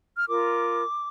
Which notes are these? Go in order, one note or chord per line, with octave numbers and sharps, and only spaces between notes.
F6
F4 A#4 D6